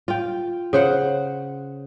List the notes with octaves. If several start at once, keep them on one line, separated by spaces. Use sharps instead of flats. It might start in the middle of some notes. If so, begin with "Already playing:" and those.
F4 G5
C#3 C5 F#5